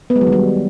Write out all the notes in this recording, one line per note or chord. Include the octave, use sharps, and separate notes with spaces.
B3
G#3
F#3
D#3
G3